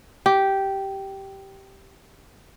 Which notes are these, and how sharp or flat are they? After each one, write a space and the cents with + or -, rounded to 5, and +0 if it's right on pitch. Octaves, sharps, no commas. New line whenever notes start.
G4 -10